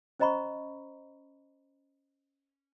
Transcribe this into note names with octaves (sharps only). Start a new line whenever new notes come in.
C#4 C5 D#5 A#5 B5 C#6